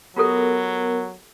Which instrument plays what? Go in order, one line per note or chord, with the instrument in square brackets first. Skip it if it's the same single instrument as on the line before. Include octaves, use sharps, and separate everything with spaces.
[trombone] F#3 [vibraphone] B3 A#4 [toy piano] F4 G4 A4